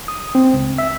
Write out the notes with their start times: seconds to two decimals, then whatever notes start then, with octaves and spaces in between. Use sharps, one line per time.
0.08 D#6
0.35 C4
0.54 C#2
0.78 E5